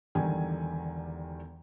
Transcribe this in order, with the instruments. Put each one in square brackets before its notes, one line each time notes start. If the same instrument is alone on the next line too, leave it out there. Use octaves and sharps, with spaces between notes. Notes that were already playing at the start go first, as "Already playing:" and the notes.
[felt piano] E1 E2 D3 D#3 G3 G#5